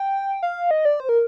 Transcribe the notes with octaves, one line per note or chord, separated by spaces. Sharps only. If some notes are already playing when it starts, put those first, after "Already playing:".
Already playing: G5
F5
D#5
D5
C5
A#4